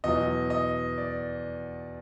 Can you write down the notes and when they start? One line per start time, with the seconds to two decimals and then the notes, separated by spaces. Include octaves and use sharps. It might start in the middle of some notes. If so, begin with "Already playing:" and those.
0.04 E2 B2 F#3 D#5
0.50 D#5
0.98 D5